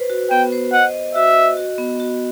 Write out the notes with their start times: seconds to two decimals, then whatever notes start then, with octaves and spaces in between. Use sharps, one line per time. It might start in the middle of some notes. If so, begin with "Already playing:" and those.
Already playing: B4 C5
0.10 F#4
0.31 B3 G5
0.52 C5
0.73 D#5 F#5
0.94 D#5
1.15 F#4 E5
1.36 D#5
1.57 F#4
1.78 B3
2.00 F#4